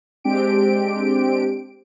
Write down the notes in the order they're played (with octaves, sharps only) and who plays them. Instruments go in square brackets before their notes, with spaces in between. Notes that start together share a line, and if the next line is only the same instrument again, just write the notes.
[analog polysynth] G#3 C4 D4 G4 D7